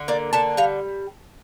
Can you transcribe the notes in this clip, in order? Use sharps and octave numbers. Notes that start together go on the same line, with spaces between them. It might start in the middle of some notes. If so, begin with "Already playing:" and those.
Already playing: D3
A#3 D5
D3 A5
G3 F5